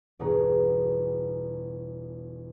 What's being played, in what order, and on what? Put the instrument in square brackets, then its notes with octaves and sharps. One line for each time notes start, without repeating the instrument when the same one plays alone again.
[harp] G1 E2 B2 G#4 C#5 A#5